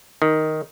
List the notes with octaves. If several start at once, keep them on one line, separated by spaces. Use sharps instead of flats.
D#3